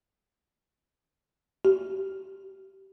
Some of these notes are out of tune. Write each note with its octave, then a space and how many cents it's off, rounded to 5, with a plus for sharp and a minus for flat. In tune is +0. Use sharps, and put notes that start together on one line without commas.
G4 -25